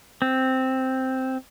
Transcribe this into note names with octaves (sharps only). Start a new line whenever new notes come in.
C4